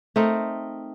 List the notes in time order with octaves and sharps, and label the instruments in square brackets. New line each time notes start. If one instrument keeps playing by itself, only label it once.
[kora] A3 C4 D#4 A#4